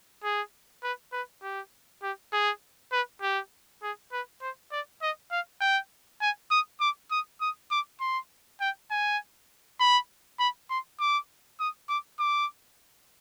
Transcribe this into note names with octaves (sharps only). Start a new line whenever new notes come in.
G#4
B4
B4
G4
G4
G#4
B4
G4
G#4
B4
C5
D5
D#5
F5
G5
G#5
D#6
D6
D#6
D#6
D6
C6
G5
G#5
B5
B5
C6
D6
D#6
D6
D6